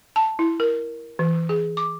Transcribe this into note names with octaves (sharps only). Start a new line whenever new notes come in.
A5
E4
A#4
E3
G#4
D6